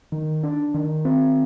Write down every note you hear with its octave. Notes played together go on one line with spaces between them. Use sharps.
D#3
D4
D#3
C4